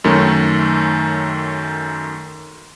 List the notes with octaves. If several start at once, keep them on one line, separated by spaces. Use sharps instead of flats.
F#2 D#3 A3 C#4